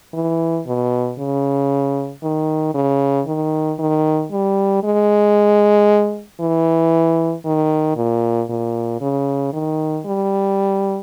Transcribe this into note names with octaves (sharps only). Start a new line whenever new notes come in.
E3
B2
C#3
D#3
C#3
D#3
D#3
G3
G#3
E3
D#3
A#2
A#2
C#3
D#3
G3